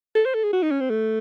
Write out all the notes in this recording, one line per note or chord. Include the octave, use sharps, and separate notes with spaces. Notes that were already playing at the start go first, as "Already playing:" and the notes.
A4
C5
A4
G#4
F#4
D#4
C#4
C4
A3